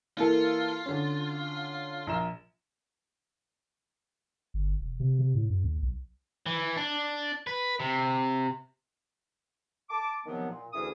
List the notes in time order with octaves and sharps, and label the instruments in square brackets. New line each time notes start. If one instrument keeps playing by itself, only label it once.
[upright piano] E3 A#3 A4 [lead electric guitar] F4
[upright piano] D3 C#4
A#1 A#5 E7
[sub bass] G1
E1
C3
C3
A2
F#2
D#2
B1
[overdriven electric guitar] E3
D4
B4
C3
[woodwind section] A5 D6
C3 D#3 F3 F#3 B3
A#2
D2 E3 C#4 G#4 D#6